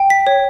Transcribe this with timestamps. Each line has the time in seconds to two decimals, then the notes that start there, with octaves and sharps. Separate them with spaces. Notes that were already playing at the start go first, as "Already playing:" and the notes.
Already playing: G5
0.10 B6
0.27 C#5